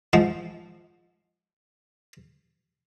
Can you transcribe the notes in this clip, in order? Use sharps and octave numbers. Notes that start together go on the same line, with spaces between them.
G#2 F3